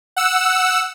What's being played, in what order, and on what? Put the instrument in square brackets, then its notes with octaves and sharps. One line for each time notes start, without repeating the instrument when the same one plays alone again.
[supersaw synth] F#5 E6